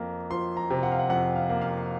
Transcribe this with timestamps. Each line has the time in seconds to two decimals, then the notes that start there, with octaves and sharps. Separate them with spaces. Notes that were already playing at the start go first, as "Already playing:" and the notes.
Already playing: F2 A#3
0.30 F3 C6
0.57 A#5
0.70 C3
0.83 F#5
0.92 F5
0.99 F#5
1.10 F2 F#5
1.36 F5
1.49 A#3
1.62 F5